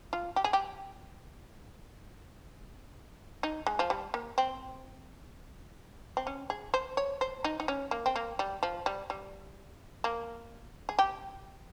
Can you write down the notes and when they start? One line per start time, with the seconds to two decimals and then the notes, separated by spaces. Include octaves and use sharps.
0.13 F4
0.36 G4
0.44 G#4
0.53 G4
3.43 D#4
3.67 G#3
3.79 F3
3.90 G3
4.14 A#3
4.38 C4
6.17 C4
6.27 C#4
6.50 G#4
6.74 C5
6.97 C#5
7.21 C5
7.44 D#4
7.60 D#4
7.68 C#4
7.91 A#3
8.06 C4
8.16 A#3
8.39 G3
8.63 F3
8.86 G3
9.10 G3
10.04 A#3
10.89 G#4
10.99 G4